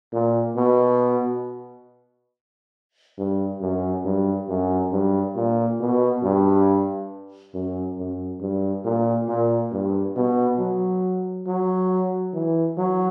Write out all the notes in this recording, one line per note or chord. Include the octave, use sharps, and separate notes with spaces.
A#2
B2
G2
F#2
G2
F#2
G2
A#2
B2
G2
F#2
F#2
G2
A#2
A#2
G2
B2
F#3
F#3
E3
F#3